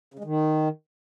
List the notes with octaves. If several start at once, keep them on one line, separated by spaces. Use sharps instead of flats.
C#3
G#3
D#3